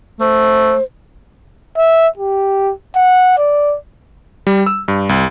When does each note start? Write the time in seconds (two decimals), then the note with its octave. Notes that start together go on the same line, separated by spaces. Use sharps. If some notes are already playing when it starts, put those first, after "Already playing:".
0.20 A3 C5
1.77 E5
2.17 G4
2.95 F#5
3.37 D5
4.47 G3
4.66 E6
4.88 G2
5.09 C2